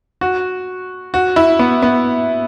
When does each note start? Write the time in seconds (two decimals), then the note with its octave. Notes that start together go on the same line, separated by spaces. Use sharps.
0.21 F#4
1.14 F#4
1.36 E4
1.59 B3
1.82 B3